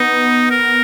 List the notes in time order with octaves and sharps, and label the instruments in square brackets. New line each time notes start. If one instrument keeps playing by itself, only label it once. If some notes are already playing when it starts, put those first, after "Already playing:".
Already playing: [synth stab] B3 [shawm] D#4
[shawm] A#4